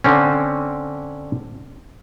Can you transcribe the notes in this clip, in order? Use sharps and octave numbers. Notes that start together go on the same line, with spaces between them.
D3 C4 C#4